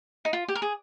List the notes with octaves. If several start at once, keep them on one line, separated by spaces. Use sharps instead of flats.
D#4
F4
G4
A#4
G#4